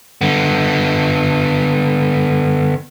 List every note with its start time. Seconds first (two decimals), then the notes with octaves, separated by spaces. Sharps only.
0.21 D3 B3